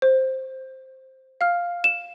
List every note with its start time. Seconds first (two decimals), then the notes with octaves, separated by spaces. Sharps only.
0.02 C5
1.41 F5 F6
1.84 E7